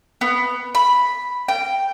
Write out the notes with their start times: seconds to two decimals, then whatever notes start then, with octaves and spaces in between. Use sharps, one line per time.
0.21 B3
0.75 B5
1.48 G5